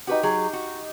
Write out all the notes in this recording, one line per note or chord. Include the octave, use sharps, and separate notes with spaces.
D#4 F#4 G4 B4
F#3 G#4
F#4